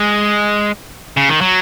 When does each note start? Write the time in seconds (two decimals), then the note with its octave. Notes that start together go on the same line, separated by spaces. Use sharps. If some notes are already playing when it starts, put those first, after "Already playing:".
Already playing: G#3
1.17 C#3
1.29 D#3
1.41 F#3